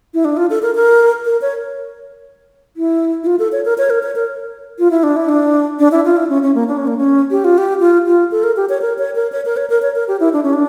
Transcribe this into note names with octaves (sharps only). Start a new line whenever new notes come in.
E4
D4
F4
A4
A#4
A#4
A#4
C#5
E4
E4
F4
A4
C#5
A#4
C#5
A#4
C#5
A#4
F4
E4
D4
E4
D4
D4
E4
F4
E4
C#4
C#4
A#3
D4
C#4
A#3
C#4
G4
F4
G4
F4
F4
A4
A#4
G4
C#5
A#4
C#5
A#4
C#5
A#4
C#5
A#4
C#5
A#4
G4
E4
D4
C#4
D4